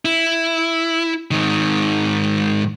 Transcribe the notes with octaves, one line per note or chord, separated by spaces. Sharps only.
E4
G#2 D#3